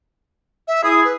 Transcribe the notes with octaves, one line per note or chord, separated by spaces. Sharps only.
E5
E4 G#4 D#6
B4